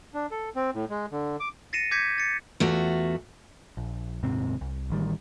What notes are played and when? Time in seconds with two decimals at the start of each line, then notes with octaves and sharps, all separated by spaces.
0.14 D4
0.31 A4
0.55 C4
0.74 A2
0.90 G#3
1.12 D3
1.40 D6
1.73 A6 A#6 C7 C#7 D#7 E7
1.91 D6 G6 G#6 B6 C#7
2.18 A6 C#7
2.60 E2 A3 F4 F#4
3.77 A#1
4.23 D#1 G#2 C3 C4
4.61 C2
4.90 A1 D#3 G3